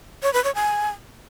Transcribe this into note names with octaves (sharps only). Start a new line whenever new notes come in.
C#5
B4
C#5
G#5